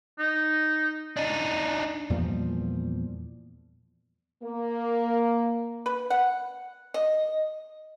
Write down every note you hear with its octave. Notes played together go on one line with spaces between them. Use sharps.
D#4
D4 D#4
E2 A#2 F3 G3
A#3
B4
F#5
D#5